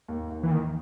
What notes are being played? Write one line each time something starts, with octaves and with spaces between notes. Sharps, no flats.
D#2
D#2
E3
D#2 D#3